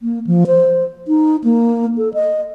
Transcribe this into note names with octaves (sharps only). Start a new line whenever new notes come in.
A#3
F3
C5
D#4
A#3
A4
D#5